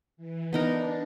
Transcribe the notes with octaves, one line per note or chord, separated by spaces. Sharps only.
E3
B3 D4 D#4 A#4